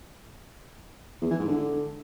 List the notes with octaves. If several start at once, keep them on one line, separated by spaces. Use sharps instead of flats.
E2
E3
G#2
D3